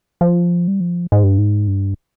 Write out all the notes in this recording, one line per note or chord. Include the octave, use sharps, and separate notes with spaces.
F3
G3
F3
G#2
G2
G#2
G2